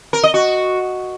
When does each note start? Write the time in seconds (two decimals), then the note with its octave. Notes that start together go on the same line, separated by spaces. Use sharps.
0.13 A#4
0.23 D#5
0.34 F#4